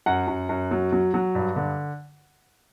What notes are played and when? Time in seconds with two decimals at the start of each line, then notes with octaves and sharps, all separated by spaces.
0.06 F#2 F#5
0.28 F#2
0.49 F#2
0.71 F#3
0.92 F#3
1.14 F#3
1.35 G2
1.56 D3